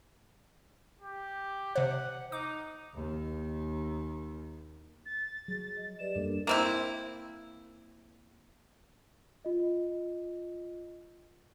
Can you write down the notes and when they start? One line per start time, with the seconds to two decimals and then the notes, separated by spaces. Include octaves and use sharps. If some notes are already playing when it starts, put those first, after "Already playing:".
1.01 G4
1.76 C3 C5 F#5
2.32 D#4 D6
2.94 D#2 D#3
5.06 A6
5.48 F#3 G#4
5.77 D#5
5.99 G4 B4 D5 E7
6.15 F#2 G3 A#3 D4 A4 A#4
6.47 A#3 C4 E4
9.45 F4 D#5